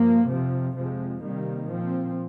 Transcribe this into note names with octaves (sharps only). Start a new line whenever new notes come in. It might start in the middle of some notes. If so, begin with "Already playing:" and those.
Already playing: G2 F3 A#3
F2 C3 F3
F2 C3 F3 G#3
C3 D#3 G3 A#3
A#2 F3 C4